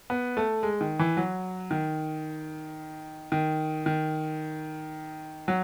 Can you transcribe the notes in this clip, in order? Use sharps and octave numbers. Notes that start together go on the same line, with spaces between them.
B3
A3
G#3
D#3
E3
F#3
D#3
D#3
D#3
F#3